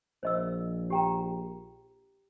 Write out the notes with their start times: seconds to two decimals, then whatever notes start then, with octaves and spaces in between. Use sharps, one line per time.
0.23 A#1 C5 D#5 E6
0.90 G4 G5 A#5